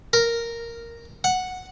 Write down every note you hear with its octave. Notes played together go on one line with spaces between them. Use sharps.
A#4
F#5